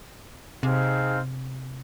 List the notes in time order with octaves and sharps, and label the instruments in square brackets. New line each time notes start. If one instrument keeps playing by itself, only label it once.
[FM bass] C3 [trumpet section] C4 D#4 G#4 C5 F5